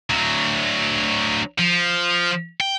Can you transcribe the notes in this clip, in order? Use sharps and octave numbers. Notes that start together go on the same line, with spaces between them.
D2 F#3
F3
G5